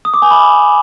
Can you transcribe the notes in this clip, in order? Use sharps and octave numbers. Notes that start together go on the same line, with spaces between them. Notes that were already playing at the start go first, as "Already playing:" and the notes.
D#6
D6
G#5
B5